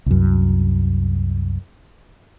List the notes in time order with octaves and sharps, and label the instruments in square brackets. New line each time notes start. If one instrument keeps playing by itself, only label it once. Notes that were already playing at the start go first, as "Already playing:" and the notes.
[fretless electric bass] C2 F#2